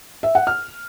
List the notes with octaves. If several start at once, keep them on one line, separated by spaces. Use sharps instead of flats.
E5
F#5
F6